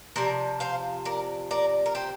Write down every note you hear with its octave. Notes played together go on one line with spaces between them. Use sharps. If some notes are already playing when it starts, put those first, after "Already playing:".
C3 F3 A#4 D5
C5 F5
A#4 D5
A#4 D5
A#4
G4 C5